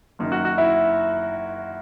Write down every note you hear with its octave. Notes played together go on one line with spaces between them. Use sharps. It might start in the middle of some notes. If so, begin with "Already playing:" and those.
F#1 F#2 D#3
F#4
F#4
E4